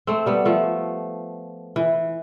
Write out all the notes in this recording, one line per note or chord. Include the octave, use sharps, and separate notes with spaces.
A3 C4
G3 B3
F3 A3
E3